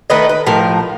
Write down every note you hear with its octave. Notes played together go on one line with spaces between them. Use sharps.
D#3 A3 B4 D#5
B4
A2 F3 A#4